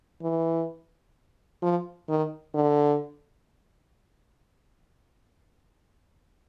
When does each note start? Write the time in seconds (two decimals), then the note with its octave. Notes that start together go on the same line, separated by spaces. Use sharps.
0.22 E3
1.62 F3
2.09 D#3
2.54 D3